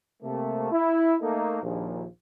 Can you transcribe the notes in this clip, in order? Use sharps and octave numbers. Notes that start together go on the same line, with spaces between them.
C3 A3 A#3
E4
A3 A#3 D#4 A4
A#1 D#2 F3